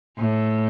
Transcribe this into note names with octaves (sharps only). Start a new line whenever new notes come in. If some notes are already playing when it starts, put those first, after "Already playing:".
A2